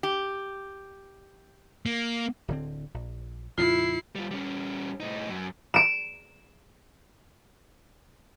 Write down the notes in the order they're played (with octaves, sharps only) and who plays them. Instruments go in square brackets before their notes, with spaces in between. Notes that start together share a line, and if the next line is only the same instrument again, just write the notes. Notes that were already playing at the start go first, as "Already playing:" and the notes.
[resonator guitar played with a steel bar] G4
[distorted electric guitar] A#3
[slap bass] D1 D3 C4
A#1
[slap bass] F2 A#2 C#3 [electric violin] E4 C7 [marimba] F4
[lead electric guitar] G3 F4
G3 C#4
A2 D#4
F#2
[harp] D7 E7